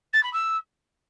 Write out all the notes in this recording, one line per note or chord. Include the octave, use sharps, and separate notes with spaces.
A6
B5
E6